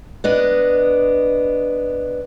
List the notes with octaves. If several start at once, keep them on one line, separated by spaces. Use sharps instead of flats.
B3 D4 D#5